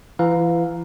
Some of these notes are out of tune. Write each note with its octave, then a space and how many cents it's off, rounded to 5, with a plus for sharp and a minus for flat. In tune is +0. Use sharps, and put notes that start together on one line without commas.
E3 +35 F5 +15 A#5 +0